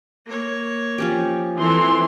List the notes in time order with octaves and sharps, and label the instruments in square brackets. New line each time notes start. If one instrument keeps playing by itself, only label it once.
[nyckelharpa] A#3 C#5
[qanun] F3 C#4 G4
[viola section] E3 C6 [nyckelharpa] C4 A4